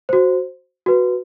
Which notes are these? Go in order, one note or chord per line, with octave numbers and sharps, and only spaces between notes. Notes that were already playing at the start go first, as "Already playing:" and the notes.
F#4 C5
F#4 B4